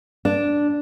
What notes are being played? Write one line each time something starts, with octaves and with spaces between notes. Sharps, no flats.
D4